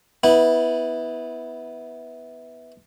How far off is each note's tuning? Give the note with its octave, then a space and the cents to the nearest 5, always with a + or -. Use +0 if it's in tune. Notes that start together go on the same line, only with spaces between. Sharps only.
B3 +0 E4 -20